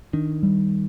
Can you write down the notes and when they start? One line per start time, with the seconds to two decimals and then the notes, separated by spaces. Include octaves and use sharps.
0.13 D#3 D4
0.43 G3